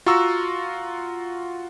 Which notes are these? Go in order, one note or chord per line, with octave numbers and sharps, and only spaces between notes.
F4 F#4 F#5 A#5 C#6 E6